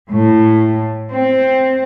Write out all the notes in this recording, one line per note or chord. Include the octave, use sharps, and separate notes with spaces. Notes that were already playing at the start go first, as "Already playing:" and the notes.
A2
C4